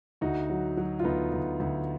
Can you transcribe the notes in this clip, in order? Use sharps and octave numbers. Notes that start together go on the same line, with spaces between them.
D2 D#4 F#4
F#3
F#3
F4
D2 B3 D#4
D2
D2